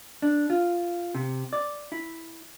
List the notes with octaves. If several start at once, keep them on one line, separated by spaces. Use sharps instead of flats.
D4
F4
C3
D5
E4